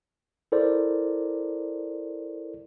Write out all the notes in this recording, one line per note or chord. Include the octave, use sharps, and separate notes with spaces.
E4 A4 A#4 C5 D5